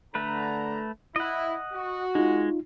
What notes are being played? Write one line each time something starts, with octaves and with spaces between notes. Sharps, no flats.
D3 A3 B4 A#5
E4 D#5 F#5
F#4
G#3 D#4 F4